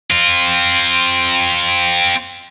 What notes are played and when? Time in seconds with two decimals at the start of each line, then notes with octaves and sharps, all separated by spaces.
0.11 C4 F4